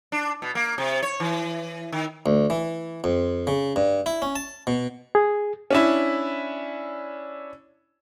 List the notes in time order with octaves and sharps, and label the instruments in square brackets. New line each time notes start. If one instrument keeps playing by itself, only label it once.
[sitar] D4
B2
A#3
C3
C#5
E3
D#3
[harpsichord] D2
E3
F2
C#3
G2
E4
C#4
A5
B2
[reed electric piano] G#4
[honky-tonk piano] C#4 D4 E4